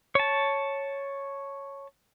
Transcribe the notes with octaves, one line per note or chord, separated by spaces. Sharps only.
C#5 A5